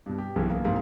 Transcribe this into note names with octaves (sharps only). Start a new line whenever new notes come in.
G2 B2
G4
B1 C#3 E3
A#3
F2 G#2 C3 A#3